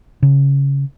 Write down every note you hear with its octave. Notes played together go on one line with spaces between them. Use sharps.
C#3